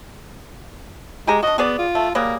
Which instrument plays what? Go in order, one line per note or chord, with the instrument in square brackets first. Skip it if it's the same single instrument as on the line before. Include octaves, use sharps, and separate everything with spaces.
[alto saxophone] G#3 [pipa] G4 G#5 A#5
[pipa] D4 F#4 [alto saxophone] D#5
[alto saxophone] B3 [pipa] F#4 G#4 D5
[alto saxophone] F4
[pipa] A3
[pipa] F#3 G3 G#4 [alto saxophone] A#3